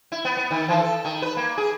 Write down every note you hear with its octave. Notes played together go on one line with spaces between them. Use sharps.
E4
B3
B3
D#3
E3
A4
D#3
B4
A#3
G#4